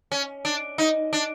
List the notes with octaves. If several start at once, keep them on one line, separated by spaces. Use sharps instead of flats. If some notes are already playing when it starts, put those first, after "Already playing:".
C#4
D4
D#4
D4